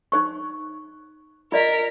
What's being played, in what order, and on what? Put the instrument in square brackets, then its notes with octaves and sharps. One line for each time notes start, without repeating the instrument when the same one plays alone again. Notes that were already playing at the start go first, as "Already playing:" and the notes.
[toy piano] D#4 C5 C#6
[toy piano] F4 D5 D#5 [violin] A#4 B6